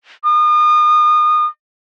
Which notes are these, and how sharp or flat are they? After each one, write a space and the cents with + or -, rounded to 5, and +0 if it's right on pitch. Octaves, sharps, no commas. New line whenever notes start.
D#6 -35